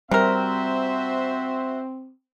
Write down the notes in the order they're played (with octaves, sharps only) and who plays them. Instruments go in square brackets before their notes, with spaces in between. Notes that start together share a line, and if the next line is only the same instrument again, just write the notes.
[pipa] C3 A#4 [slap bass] G3 [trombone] C4 [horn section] F#4 C5 E5